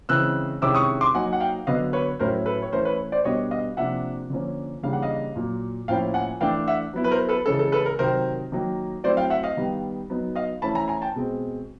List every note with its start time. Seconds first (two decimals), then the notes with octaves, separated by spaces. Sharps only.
0.09 C#3 E3 G#3 C4 E6 F#6
0.62 C3 D#3 G#3 C#4 E4 D6 E6
0.75 C#6 D#6
1.01 C6 D6
1.14 F#3 A#3 D#4 F#5 G#5
1.33 F#5
1.40 F5 G5
1.67 D3 F#3 B3 D#5 F5
1.93 B4 C#5
2.19 A2 F#3 A3 C#4 E4 A#4 C5
2.46 A4 B4
2.62 C#5
2.72 E3 A3 C#4 E4 A#4 C5
2.85 B4 C#5
3.12 C5 D5
3.24 B2 G3 B3 D4 C#5 D#5
3.51 D#5 F5
3.77 C3 F3 A#3 D4 E5 F#5
4.30 D3 F3 A#3 C#4
4.83 C#3 E3 G3 A#3 D4 F5
4.93 F#5
5.02 D#5 F5
5.36 A#2 F#3 A#3
5.88 A2 F3 A#3 C#4 E4 F5 G5
6.14 F#5 G#5
6.41 E3 A3 D4 F5 G5
6.67 E5 F#5
6.93 F#3 B3 E4
7.04 B4
7.11 A#4 C5
7.29 A4 B4
7.46 C#3 E3 G#3 C#4 A4
7.59 A4
7.72 A4 B4
7.86 A#4
7.99 C3 D#3 F#3 A#4 C5
8.52 D#3 F#3 A#3
9.04 F#3 A3 C4 E4 C5 D5
9.17 F5 G5
9.30 E5 F#5
9.43 D#5 F5
9.57 D#3 G3 B3
10.10 F#3 B3 D#4
10.36 D#5 F5
10.62 E3 A3 C#4 E4 A5 B5
10.75 G#5 A#5
10.88 G#5 A#5
11.02 G5 A5
11.15 B2 G#3 C4